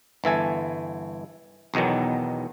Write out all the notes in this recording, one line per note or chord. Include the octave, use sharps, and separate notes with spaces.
G1 E3 A4 G#5
B1 E2 B2 D#3 F#3